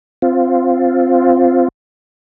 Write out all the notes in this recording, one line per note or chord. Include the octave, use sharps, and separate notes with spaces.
C4 F4